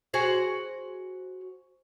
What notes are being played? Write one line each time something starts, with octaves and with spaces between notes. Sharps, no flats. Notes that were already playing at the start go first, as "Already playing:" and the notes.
F#4 G#4 C5